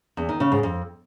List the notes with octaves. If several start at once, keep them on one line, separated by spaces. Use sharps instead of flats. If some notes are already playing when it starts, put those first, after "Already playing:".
E2
D#3
C#3
G#2
F2